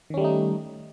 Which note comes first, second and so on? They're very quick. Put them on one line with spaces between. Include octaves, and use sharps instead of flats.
D#3 C#4 G3 A3 D#4